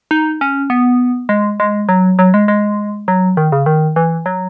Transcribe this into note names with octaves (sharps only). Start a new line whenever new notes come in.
D#4
C#4
B3
G#3
G#3
F#3
F#3
G#3
G#3
F#3
D#3
C#3
D#3
E3
F#3